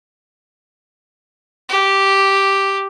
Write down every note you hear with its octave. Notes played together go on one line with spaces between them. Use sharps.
G4